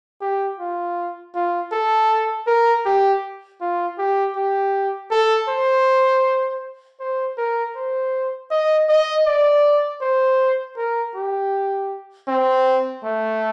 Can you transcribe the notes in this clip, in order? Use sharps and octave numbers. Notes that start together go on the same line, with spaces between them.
G4
F4
F4
A4
A#4
G4
F4
G4
G4
A4
C5
C5
A#4
C5
D#5
D#5
D5
C5
A#4
G4
C4
A3